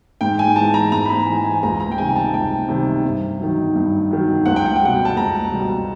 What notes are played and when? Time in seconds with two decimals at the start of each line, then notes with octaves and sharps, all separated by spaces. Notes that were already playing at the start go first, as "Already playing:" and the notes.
0.21 G#2 G5
0.39 G#5
0.56 E3 G#3 A5
0.74 A#5
0.92 G#2 A#5
1.05 B5
1.10 A#5
1.27 E3 G#3 G#5
1.45 G#5
1.63 C#2 A#5
1.80 A#5
1.92 G5
1.98 C3 D#3 G3 G#5
2.16 A5
2.33 C#2 G5
2.69 C3 D#3 G3
3.05 G2
3.40 D#3 F#3
3.75 G2
4.11 D#3 F#3
4.46 C#2 F#5
4.56 G5
4.66 F#5
4.76 G5
4.81 B2 G3 F#5
5.05 A5
5.17 C#2 A#5
5.52 B2 G3